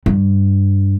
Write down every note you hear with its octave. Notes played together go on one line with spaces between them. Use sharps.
G2